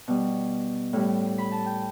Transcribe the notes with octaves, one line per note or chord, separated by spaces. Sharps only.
B2 G3
A2 G3
B5
A5
G5